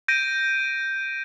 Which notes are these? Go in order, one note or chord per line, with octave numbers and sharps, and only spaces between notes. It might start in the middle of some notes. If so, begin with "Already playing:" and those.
G6 A#6 D7 D#7